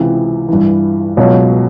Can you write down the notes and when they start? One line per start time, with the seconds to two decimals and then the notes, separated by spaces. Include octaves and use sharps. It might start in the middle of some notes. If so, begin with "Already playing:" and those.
Already playing: C#2 C3 E3
0.48 G2 E3
1.17 C#2 B2 F#3